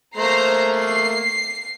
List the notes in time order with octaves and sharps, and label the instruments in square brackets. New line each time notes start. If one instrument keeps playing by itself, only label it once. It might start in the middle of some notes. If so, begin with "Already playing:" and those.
[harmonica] A3 A#3 [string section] C5 A#5 C7
[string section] C7